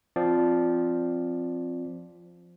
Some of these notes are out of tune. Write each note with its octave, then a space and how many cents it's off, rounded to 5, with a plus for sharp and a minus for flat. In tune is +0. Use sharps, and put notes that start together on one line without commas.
F3 +0 C4 +0 D5 +0